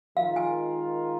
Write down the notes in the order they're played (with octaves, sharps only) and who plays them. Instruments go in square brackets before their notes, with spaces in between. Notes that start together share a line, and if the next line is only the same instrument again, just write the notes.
[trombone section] D#3 G#3 F4 A#4 [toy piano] F5
[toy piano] G#5